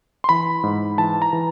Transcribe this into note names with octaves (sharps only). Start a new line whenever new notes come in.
C6
E3 B5
G#2
E3 A5
A#5
E3